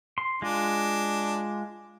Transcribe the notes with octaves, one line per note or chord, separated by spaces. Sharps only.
C6
G#3 D4 F4